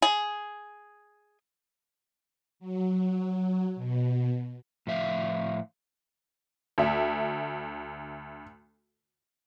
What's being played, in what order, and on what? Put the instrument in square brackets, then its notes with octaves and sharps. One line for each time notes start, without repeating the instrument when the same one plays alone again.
[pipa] G#4
[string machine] F#3
B2
[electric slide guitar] A2 F3 E5 F5
[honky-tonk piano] D2 E5